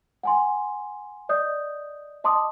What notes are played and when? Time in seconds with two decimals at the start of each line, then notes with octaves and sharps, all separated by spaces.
0.23 F#5 G#5 C6
1.29 D5 D#5 D#6 G6
2.24 D#5 A5 C6 D6 D#6